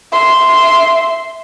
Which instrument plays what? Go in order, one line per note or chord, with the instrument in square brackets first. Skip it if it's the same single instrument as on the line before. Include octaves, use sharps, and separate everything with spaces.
[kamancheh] E5 C6